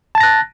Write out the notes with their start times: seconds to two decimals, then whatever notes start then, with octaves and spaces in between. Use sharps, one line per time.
0.15 A5
0.18 A6
0.21 A#6
0.23 F#6